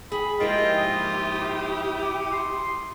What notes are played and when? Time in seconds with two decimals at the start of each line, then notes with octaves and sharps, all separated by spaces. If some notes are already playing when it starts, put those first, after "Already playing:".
0.12 G#4 B5
0.40 G#2 F3 A#3 E4 F4 G4 D#5 G5
0.77 D#6
2.02 D6
2.33 C6